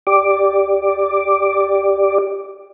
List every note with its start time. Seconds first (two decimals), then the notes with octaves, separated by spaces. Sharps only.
0.07 G4 D5 D6